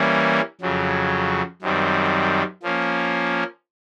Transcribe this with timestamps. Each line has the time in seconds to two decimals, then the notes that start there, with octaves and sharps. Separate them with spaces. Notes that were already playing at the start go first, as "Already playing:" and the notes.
Already playing: E3 G3 A#3 C#4
0.61 F2 C#3 F#3
1.62 F#2 D#3 G3 C4
2.63 F3 A#3 C#4